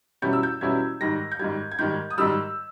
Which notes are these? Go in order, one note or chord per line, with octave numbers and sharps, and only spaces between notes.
E2 B2 G3 C#4 E4 G6
E6
G6
E2 B2 G3 C#4 E4 G#6
G#2 D#3 G3 A#6
G6
G#2 D#3 G3 G#6
G#6
G#2 D#3 G3 G6
D#6
G#2 D#3 G3 E6